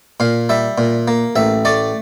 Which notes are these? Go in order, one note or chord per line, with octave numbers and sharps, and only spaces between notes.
A#2 F5
G3 E5
A#2
A#3
A1 E5
A3 D5